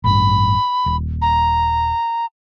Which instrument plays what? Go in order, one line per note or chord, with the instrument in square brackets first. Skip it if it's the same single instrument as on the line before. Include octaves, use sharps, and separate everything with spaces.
[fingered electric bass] A1 G2 [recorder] B5
[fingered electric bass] D#1
[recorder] A#5